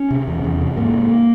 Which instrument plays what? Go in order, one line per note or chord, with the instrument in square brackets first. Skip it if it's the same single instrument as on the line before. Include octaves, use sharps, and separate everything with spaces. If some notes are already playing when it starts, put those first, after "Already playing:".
Already playing: [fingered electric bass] C#4
C3
E2
E2
C3
G#2 A#3
G#2